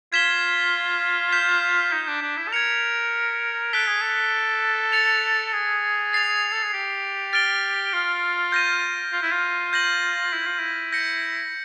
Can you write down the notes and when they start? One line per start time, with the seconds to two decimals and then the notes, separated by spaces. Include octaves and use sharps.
0.13 F4 G#6 B6 E7 G7
1.32 G6 B6 E7
1.92 D#4
2.08 D4
2.22 D4
2.37 E4
2.47 A4
2.52 A#4 G#6 C#7 F7
3.73 A4 F#6 B6 D7 G7
3.87 G#4
4.01 A4
4.92 A6 C#7 F7
5.53 G#4
6.13 A6 C7 F7
6.52 A4
6.63 G#4
6.73 G4
7.33 F6 A6 D7 G7
7.93 F4
8.52 G6 A#6 D#7
9.13 F4
9.23 E4
9.32 F4
9.73 G6 A#6 D#7 F#7
10.33 E4
10.47 F4
10.59 E4
10.92 G6 A#6 C#7